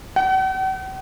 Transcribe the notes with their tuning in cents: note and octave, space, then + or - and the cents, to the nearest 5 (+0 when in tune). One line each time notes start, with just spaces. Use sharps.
F#5 +45